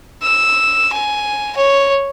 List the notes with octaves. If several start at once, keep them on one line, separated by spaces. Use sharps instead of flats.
E6
G#5
C#5